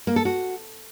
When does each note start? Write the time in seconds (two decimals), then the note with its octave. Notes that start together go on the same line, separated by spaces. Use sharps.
0.07 A#3
0.16 A4
0.25 F#4